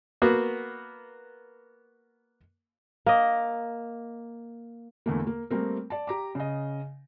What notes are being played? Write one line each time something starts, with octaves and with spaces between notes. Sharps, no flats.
A#3 B3 F#4
A#3 D#5
E2 D3 A3 A#3
A#3
G3 A3 A#3 C4 A#4
D5 A5
G4 A#5 D6
C#3 D#5